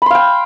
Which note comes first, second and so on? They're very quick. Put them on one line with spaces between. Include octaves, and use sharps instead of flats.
B5 C6 F5 G5